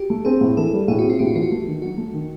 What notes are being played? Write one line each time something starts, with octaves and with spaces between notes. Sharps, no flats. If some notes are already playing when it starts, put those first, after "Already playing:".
Already playing: F#4 G4
A3
C4 G#4
A2
E3 A4
G3
A2 G#4
C4 F#4
F4
A2 G4
F#4
E3 F4
F#4
A3
D#3
F#3 F#4
A3
D#3